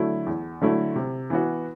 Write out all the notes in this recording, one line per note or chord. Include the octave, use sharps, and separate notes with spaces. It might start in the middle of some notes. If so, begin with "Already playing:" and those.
Already playing: D3 F#3 A3 E4
E2
D3 F#3 A3 E4
C3
E3 B3 F#4